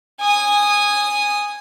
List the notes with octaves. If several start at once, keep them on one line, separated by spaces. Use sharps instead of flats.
G#5 D#6